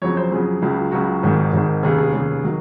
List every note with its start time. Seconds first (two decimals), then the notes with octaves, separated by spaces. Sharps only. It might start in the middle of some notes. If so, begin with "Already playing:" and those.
0.02 F2 C#3 F#3 C#5
0.17 C5
0.32 F2 C#3 F#3 G#4
0.62 C#2 C#3 F#3
0.92 C#2 C#3 F#3 F#4
1.23 G#1 G#2 D#3
1.53 G#1 G#2 D#3
1.83 F1 D#2 C#3 G#4
1.98 G#4
2.13 F1 D#2 C#3 G#4
2.44 D#3 F#3